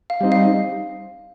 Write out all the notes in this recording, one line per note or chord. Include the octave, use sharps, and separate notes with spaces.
F5
G3 C4 D#4
F5